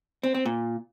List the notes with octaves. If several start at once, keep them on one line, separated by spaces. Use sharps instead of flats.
C4
C4
A#2